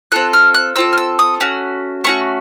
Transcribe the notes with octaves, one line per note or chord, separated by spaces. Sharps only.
C4 F4 A4 F#6
F6
F#6
C4 F4 A4 E6
F6
E6
D#6
A3 C#4 F#4
A3 C#4 F#4 C#6